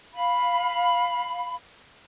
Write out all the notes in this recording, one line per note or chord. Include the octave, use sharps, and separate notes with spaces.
F5 B5